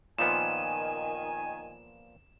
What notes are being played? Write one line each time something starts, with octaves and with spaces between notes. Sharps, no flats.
A#2 D#3 F3 B3 G#5 E7